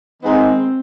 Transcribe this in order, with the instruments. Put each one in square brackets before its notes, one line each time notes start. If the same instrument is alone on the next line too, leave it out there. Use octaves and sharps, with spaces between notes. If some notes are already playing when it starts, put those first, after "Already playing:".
[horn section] D#3 G#3 B3 D#4 [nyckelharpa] C4